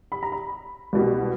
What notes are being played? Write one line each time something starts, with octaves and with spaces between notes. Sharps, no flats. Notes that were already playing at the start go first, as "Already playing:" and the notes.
B5
A#5
B5
C2 B2 G3